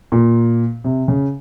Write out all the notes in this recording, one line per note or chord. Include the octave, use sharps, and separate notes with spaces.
A#2
C3
C#3